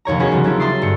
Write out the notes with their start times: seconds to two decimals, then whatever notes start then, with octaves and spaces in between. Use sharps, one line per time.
0.05 F1 D#2 C#5 A#5
0.19 B3 C#4 D#4 F#4 G#4 B4
0.31 C#3 F3 G3
0.44 F#3 G3 C#4 D4 E4 F4
0.60 E5 A#5 C6 D#6 A6 C7
0.82 G1 G2 C#7